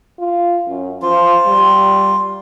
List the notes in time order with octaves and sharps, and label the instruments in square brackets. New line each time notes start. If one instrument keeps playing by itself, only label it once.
[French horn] F4
F#2
[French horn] F3 [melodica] F4
[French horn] G3